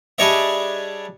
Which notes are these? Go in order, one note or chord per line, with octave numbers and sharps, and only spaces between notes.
G3 D4 G#4 C#5 D#5 E5